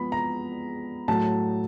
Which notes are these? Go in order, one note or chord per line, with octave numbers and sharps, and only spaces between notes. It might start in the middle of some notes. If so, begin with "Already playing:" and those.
Already playing: F3 G#3 B3 B5
A#5
A2 F#3 A3 A5